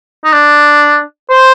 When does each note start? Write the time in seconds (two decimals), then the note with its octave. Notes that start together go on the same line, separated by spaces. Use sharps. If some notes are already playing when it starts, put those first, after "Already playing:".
0.25 D#4
0.33 D4
1.30 C5